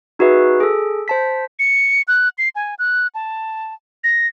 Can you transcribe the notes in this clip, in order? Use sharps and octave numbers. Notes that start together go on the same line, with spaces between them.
D#4 F#4 G#4 B4 E5
G#4 A4
C5 A5 B6
C#7
F#6
C7
G#5
F#6
A5
A#6